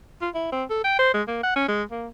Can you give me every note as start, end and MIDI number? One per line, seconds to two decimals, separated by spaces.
0.22 0.29 65
0.34 0.50 64
0.52 0.64 60
0.70 0.83 69
0.84 0.95 79
0.99 1.13 72
1.14 1.22 56
1.28 1.39 58
1.43 1.55 78
1.56 1.66 61
1.68 1.83 56
1.91 2.08 58